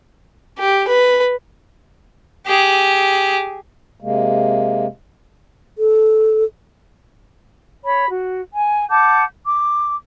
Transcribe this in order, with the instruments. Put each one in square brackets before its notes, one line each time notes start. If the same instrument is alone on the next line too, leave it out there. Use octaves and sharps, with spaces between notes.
[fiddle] G4
B4
G4 G#4
[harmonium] C3 G#3 A#3
[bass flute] A4
[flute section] C#5 B5
F#4
G#5
F#5 A5 D6 G6
D6